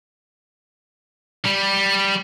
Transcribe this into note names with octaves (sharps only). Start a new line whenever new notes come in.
G3